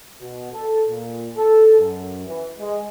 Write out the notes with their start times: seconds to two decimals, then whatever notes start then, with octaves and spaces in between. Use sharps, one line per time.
0.21 B2
0.53 A4
0.88 A#2
1.36 A4
1.79 F#2
2.26 E3
2.58 G#3